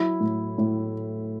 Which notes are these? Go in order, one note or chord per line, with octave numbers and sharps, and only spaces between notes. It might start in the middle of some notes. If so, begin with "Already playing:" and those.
Already playing: F#3 E4 E5
A2
A2